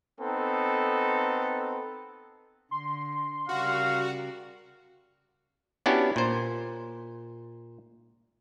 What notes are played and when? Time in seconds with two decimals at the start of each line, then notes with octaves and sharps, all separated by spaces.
0.20 B3 C4 D#4 A4
2.71 D3 C6
3.49 C#3 G3 F#4 A#4 F5
5.86 B3 C#4 D4 E4 F#4 G4
6.16 A#2 C5